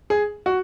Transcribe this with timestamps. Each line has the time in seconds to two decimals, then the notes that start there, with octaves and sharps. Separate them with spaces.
0.10 G#4
0.46 F#4